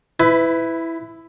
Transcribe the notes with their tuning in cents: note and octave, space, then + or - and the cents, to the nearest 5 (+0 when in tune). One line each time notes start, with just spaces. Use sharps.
E4 +0 B4 +25